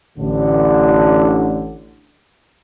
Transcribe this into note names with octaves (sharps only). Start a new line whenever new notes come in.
A1 A2 D3